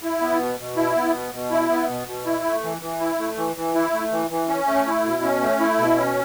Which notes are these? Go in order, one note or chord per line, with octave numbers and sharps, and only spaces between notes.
E4
B3
B2
B2
E4
B3
B2
B2
E4
B3
B2
B2
E4
A3
E3
E3
E4
A3
E3
E3
E4
A3
E3
E3
C#4
A3
E4
B2
C#4
A3
E4
B2
C#4